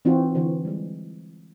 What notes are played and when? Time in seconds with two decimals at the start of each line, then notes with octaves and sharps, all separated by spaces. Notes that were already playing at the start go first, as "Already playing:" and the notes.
0.05 E3 C4 D#4 F4 F#4
0.35 D3 E3 F#4 C5
0.65 G3 G#3